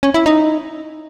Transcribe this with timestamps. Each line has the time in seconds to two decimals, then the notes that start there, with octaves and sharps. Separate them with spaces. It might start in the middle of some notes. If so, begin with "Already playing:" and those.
0.03 C#4
0.14 E4
0.26 D#4